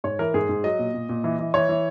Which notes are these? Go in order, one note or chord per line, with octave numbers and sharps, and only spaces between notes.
G#2 C#5
E3 A#4
G#2 G#4
G#2
F#3 D#5
A#2
A#2
A#2
E3
E3
E3 C#5
E3